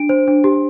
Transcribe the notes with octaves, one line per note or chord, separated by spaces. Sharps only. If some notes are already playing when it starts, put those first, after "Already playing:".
Already playing: D4 D7
C5
D4
G4